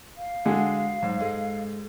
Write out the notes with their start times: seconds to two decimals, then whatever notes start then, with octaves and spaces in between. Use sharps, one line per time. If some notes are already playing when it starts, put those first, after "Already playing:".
0.17 F5
0.45 D3 G#3 F#4 F#5 G#5
1.03 G#2 F#3
1.20 G#3 G#4 A4